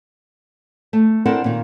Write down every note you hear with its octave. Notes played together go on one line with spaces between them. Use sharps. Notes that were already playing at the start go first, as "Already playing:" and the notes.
A3
C4 D4 E4 A4 A#4 F#5
A#2 D#3